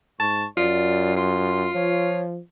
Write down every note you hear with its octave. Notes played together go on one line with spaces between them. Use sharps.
G#2 A5 C#6
F#2 F4 D5
F4 C6
F3 C#5